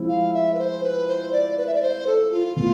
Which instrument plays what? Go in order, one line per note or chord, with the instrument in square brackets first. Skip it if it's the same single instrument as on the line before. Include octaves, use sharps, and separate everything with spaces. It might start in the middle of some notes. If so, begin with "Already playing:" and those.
Already playing: [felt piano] F3 G#3 C4 E4
[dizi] F5
E5
B4
C5
B4
C5
D5
B4
E5
D5
C5
A4
F4
[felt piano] A2 E3 B3 [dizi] F4